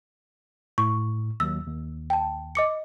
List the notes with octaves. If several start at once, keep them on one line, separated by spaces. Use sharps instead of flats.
A2 C#6
D#2 F#3 E6
D#2
G5 A5
D#5 D6 C#7